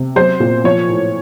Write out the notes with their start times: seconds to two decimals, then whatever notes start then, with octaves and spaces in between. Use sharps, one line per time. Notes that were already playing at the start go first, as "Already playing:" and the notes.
Already playing: C3
0.16 F#3 C5
0.40 A#2
0.64 F3 C#5
0.89 A2